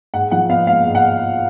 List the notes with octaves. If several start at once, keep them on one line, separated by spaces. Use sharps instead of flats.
G#2 F#5
F3 F#5
B3 F5
G#3 F5
G#2
F#5